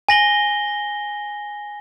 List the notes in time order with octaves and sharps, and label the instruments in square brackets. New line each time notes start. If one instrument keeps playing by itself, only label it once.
[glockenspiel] G#5 A#6 F#7 G7